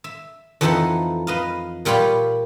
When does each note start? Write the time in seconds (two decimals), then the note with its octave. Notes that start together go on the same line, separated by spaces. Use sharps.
0.04 E5
0.61 F2 E3 F3 D#4 A4 F#5
1.27 B4 D#5 F5
1.85 A#2 G3 F4 G4 C#5 B5